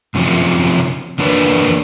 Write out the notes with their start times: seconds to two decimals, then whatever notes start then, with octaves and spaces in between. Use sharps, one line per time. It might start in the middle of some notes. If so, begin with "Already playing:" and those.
0.15 F#2 C3 F3 C#4
1.18 E2 A#3 D4 B4 C#5